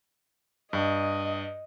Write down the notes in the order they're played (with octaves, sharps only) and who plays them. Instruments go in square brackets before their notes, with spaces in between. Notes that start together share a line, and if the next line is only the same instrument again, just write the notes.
[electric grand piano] G2 [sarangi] D#5